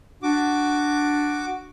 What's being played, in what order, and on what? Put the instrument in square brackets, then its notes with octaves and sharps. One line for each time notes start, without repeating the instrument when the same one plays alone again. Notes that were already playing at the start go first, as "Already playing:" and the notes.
[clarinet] D4 [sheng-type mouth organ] F#4 D6